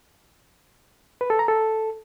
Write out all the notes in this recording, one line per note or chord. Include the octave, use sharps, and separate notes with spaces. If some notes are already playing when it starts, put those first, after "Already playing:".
B4
A4
A#5
A4